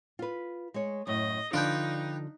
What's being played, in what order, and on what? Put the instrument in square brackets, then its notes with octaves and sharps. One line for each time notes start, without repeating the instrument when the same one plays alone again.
[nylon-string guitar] F4 B4
G#3 C#5
[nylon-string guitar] F#2 A2 [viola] D#5
[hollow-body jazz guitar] D3 F3 D4 [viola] D#4 [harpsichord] F4 B4 G5 [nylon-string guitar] D5